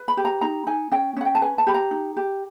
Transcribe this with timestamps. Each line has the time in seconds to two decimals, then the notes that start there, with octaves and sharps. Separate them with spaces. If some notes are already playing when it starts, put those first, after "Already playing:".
Already playing: B4
0.08 B5
0.17 G4
0.25 A#5
0.41 D#4 A#5
0.67 D#4 G#5
0.92 C#4 G5
1.17 C#4 F#5
1.25 G5
1.35 A5
1.41 B4 G#5
1.58 A5
1.67 G4 B5
1.74 A#5
1.91 D#4
2.17 G4